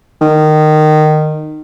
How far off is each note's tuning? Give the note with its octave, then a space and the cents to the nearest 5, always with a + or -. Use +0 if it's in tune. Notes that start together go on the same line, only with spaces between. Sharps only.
D#3 -20